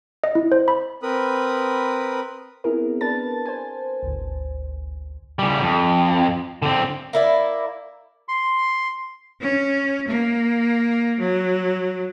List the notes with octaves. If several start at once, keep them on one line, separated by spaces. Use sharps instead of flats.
D#5
E4
C5
B5
C4 A#4 B4 B5 D#6
B3 C4 E4 G#4 A#4
D4 A#4 B4 A5 A6
C5 G#5
G#1 D2
C#3 G3
F2
D3 C4
A#3 E4 D5
C6
C#4
A#3
F#3